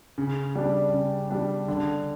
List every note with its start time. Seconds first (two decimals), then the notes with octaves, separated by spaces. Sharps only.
0.18 C#3
0.56 G3 D4
0.94 C#3
1.30 G3 D4
1.68 D3